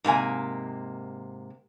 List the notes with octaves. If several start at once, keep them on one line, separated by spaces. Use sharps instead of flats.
G#2 C3 A#3 G#5